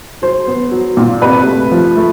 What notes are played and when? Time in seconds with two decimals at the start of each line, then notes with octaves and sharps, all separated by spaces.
0.22 F#3 C5
0.48 B3
0.72 F#3
0.97 A#2
1.22 C3 B4
1.46 A3
1.71 F3
1.97 A3